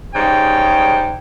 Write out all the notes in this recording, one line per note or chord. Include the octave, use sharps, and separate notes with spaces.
G#2 C#3 G3 G5